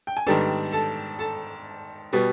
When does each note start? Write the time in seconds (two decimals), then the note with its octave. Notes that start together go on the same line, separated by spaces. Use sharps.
0.07 G5
0.17 G#5
0.27 G#2 D#3 G3 B3 D4 A4 A5
0.72 A4 A5
1.19 A4 A5
2.13 B2 G3 B3